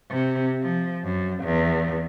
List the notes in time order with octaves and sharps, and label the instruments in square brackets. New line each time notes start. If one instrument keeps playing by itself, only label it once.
[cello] C3
F3
F#2
E2